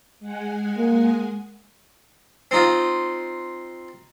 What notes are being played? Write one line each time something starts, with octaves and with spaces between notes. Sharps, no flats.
G#3 F#5 G#5
A#3
C4 D#4 F4